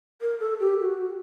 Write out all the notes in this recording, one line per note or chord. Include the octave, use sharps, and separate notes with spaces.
A#4
A4
G4
F#4